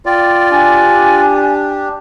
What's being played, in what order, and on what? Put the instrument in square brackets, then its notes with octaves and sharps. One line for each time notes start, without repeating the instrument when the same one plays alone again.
[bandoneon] F4 D5 [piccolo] G5
[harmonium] D4 G4 [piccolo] G#5